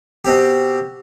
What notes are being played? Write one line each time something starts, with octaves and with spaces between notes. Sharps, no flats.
B2 C4 G4